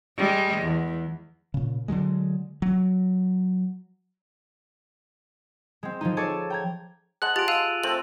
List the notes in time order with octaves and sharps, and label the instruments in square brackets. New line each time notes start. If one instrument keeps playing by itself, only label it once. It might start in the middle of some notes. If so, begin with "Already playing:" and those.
[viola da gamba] G3 G#3
E2
[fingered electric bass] A#2 C#3
D3 D#3 F#3 G#3
F#3
[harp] G#3 C4
F3 G#3 D#4
G#4 A4 C#5 D5 G#5 A5
G5 A#5 G#6
[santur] G#3 F#5 A5 [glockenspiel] F#6 F#7
[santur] F4 [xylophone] G4 [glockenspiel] A6 D7
[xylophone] F5 [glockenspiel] E6 D#7 F7
[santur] A3 C4 [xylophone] F#7